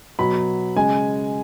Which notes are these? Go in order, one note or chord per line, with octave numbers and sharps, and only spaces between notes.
B2 F#3 B5
C#3 G#3 G#5